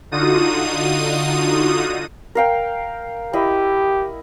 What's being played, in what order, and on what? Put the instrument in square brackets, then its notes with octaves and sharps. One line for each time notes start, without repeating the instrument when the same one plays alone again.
[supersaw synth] D3 D#4 F4 F#4 D#6 D#7
[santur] A#4 F5 G5
[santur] E4 D#5 [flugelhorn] G4